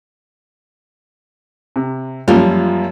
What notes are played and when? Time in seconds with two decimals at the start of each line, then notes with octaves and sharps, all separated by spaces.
1.76 C3
2.28 F#2 F3 G3 A#3 F4